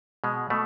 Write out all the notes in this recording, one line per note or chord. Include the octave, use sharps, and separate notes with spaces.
B2 G#3
B2 A3